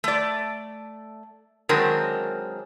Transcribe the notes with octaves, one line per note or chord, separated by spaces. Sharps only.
A3 D5
D#3 F#3 G#3 C4 D4 A#4